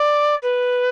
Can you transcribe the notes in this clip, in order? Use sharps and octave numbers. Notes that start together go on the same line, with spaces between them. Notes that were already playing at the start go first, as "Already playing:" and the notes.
Already playing: D5
B4